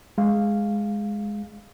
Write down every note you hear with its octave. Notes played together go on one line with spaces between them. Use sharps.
G#3 F5